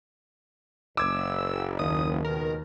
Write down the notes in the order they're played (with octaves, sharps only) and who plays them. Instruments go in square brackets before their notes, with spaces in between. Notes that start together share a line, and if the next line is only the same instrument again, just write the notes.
[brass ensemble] F#1 [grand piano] D6 G#6 [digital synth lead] E6
[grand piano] D#2 [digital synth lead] D#6
[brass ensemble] C#2 B2 D#3 [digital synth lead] A#4